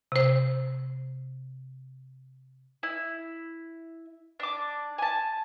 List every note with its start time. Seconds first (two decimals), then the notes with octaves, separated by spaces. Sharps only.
0.12 C3 C5
2.83 E4
4.40 D4 D6
4.98 G#5 A5